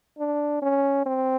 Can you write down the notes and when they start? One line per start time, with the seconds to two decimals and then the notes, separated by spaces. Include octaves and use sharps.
0.18 D4
0.62 C#4
1.06 C4